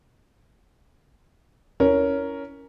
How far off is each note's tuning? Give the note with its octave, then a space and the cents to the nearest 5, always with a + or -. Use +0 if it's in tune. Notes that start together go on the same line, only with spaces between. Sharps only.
C#4 +10 E4 +0 A#4 +0